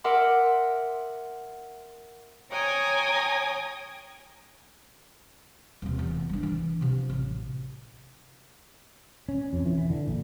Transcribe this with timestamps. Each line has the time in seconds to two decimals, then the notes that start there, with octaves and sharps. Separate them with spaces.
0.04 A#4 E5 F#5 C6 D6
2.50 C#5 G5 G#5 A#5 D#6
5.82 D#1 C3
5.99 E2
6.29 G3 D4
6.43 E3
6.81 C3 F3
7.10 A1
9.29 C#4
9.53 F2
9.65 E3
9.78 E3
9.90 D3
10.08 A#1